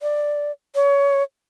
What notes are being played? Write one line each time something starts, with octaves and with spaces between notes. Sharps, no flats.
D5
C#5